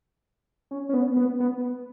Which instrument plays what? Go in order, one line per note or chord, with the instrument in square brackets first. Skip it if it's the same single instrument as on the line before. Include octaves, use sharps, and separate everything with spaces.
[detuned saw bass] C#4
C#4
B3
B3
B3